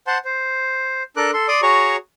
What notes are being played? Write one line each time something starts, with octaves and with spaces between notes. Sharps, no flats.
C5 F#5 A5 C6
C5
D4 A4 A#4 D6 F#6
A4 C6
D5 C6 D6 D#6
F#4 G#4 C#5 A#5 C#6